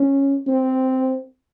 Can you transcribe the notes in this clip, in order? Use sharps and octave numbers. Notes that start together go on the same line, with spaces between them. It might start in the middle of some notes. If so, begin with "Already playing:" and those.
Already playing: C#4
C4